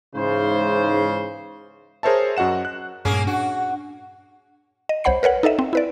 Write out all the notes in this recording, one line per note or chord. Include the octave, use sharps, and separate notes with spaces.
G#2 C#3 E3 C5
G#4 A#4 C5 C#5 E5 A5
F#2 F#4 D#5 F#5 E7
F#6
G2 A#2 A#3 C#4 G#4
D4 F#4
D#5
C2 C5 C#5 F#5 B5 C7
A#4 B4 C#5 F#5
D#4 A4 D#5 E5
C4
E4 B4 D5